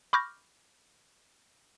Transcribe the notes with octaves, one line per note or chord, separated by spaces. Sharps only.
B5 C#6 D6 F6 G6 A#6